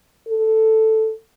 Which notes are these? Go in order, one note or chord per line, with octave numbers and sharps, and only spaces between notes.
A4